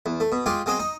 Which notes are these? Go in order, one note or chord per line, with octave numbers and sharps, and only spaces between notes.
E2
A3
B2
G#3 F4 G4
F#3 G#3 C4 D#5
D#4